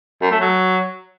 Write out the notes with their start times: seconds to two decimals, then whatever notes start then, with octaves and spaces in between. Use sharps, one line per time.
0.22 F#2
0.31 A3
0.41 F#3